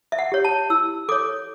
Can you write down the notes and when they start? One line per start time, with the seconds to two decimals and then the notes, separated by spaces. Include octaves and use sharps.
0.12 E5
0.19 F#5
0.32 G4 C#5
0.44 A5
0.70 E4 E6
1.09 A4 C#5 D6